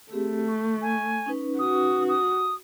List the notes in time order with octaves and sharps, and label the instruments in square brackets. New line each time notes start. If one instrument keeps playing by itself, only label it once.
[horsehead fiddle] A3 [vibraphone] C4 G4 G#4
[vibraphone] C#6
[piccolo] G#5
[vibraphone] C#4 D#4 B4
[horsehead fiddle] F#4 [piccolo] D#6
[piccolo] D#6